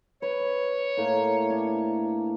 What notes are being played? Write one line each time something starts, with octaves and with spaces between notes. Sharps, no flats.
B4 C#5
A2 A#3
D4